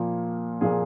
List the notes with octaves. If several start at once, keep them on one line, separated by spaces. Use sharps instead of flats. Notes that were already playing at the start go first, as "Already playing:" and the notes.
Already playing: A#2 F3 A#3
A#2 F3 A#3 G#4